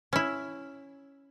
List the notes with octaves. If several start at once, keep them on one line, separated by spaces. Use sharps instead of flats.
C#4 E4